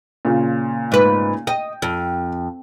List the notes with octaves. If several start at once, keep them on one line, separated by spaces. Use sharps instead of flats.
A#2 C#3 F4
G#2 B4
D#5 G5
F2